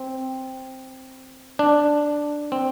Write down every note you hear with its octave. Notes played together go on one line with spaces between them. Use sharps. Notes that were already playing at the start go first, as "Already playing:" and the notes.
Already playing: C4
D4
C4